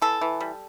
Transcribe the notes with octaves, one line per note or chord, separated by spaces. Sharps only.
E3 A4
E3
G3